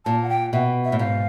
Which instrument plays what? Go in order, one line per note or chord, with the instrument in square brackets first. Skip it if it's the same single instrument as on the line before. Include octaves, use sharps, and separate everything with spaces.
[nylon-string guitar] A#2 [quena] A5
[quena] F#5
G5
[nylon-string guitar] B2 [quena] E5
[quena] E5
[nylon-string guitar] A2
[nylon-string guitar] G#2 [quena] F5